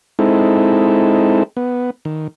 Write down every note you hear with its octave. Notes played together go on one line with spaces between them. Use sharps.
G#3 C4 D#4 E4 A4
B3
D#3